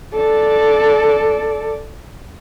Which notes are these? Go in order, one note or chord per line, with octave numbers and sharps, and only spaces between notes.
A4 D5